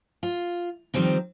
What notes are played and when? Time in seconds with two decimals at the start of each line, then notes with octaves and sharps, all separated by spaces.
0.23 F4
0.94 D#3 F3 G3 C4 D#4